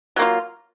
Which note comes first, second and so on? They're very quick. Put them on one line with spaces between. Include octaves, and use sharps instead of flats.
F#3 A#3 F4